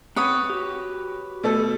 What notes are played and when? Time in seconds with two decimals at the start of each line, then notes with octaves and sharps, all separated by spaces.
0.16 C4 B4 C#5 F#5 D#6
0.50 F#4 G4
1.44 B2 A3 A4